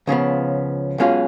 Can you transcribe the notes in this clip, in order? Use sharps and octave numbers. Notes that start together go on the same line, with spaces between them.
C#2 C#3 F3 B3
B1 B2 G#3 C#4 F4